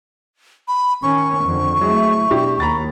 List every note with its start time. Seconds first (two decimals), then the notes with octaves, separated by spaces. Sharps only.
0.68 B5
1.03 D#3 C#4 C#6
1.45 F2 D3
1.81 F#3 G#3 A3 E4
2.30 B2 D4 E4 G4
2.60 D#2 A#5 B5 A6